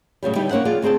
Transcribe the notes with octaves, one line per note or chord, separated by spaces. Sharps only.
A2 C#3 F#3 G3
D3 G3 B3 D#4 E4 G4
C#3 A#3 C#4 C5 F#5
F3 F4 G#4 D5
D2 C4 G#4 G5 A5